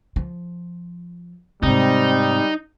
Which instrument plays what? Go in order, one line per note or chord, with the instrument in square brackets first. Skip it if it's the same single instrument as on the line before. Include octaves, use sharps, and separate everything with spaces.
[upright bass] F3
[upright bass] G#2 C3 [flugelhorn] G3 [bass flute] C4 [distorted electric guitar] D#4